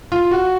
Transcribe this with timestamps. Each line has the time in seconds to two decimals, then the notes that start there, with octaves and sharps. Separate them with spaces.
0.12 F4
0.31 F#4